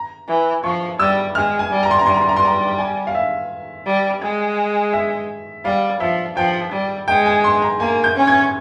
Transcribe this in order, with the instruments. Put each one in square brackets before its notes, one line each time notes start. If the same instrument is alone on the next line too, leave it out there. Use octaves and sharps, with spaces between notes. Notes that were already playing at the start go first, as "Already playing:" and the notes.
Already playing: [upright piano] A#5
[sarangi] E3
[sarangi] F3 [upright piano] C#6
[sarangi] G3 [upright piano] E6
[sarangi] G#3 [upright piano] F6
[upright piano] G#5
[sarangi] G3
[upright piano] A#5
C6
A#5
[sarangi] G3 [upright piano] C6
[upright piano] A#5
C6
A#5
C6
A#5
G#5
F5
E5
[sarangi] G3
G#3
[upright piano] E5
[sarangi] G3 [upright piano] F5
[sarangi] F3 [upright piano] E5
[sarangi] F3 [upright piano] G5
[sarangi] G3
[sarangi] G#3 [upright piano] G5
[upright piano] G#5
C6
A#5
[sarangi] A#3 [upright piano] G#5
[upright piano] G6
[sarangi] C#4
[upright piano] G#6